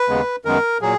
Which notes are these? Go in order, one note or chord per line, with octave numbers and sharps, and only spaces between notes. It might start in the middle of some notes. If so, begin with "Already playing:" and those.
Already playing: B4
D#2 C#3 G#3 B3
F#2 D#3 G#3 B3 A#4
A#2 F#3 G#4